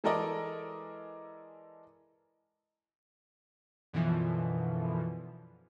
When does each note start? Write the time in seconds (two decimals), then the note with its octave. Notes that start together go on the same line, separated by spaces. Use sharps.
0.04 E3 G#3 A4 A#4 D5 D#5
3.93 F#2 B2 D3 E3 F3